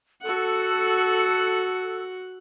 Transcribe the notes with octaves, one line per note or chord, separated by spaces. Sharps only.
F#4 A4 F#5